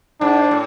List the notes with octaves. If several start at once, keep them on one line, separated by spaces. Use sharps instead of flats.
G#2 D4
A2